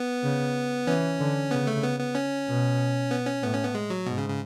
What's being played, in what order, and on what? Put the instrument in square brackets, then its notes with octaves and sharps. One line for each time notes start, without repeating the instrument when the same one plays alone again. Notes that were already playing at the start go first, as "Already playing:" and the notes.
Already playing: [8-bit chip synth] B3
[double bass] C#3
[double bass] E3 [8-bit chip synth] C#4
[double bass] D3
[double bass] C#3 [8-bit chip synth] B3
[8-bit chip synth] A3
B3
B3
C#4
[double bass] B2
[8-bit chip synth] B3
C#4
[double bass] A2 [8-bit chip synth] B3
[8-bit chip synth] C#4
B3
G#3
F#3
[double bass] G#2 [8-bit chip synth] B2
[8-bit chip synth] C#3
C#3